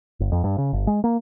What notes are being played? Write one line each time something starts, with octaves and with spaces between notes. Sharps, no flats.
G1
F2
G2
C#3
G1
G#3
A#3